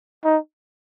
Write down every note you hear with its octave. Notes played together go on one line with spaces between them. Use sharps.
D#4